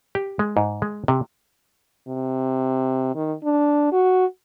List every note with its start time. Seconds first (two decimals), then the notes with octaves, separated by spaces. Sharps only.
0.15 G4
0.39 G#3
0.57 G#2
0.82 G#3
1.08 C3
2.08 C3
3.15 D#3
3.44 D4
3.92 F#4